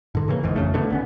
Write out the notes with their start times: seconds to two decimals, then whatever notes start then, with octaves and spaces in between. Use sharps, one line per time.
0.15 G#2 D3
0.28 C#3 E3 G3 A#3
0.43 G#1 E2 G#2
0.55 F2 C#3 A3
0.74 B2 D3 A3
0.90 G#1 B3 C#4